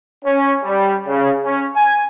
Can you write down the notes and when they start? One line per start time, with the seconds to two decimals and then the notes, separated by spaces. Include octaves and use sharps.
0.25 C#4
0.63 G3
1.07 C#3
1.44 C#4
1.75 G#5